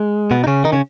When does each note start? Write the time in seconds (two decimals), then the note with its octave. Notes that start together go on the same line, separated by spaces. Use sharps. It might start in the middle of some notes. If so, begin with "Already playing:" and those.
Already playing: G#3
0.31 B2 B3
0.44 D#4
0.47 C#3 C#4
0.64 D#3 D#4
0.72 C#3 C#4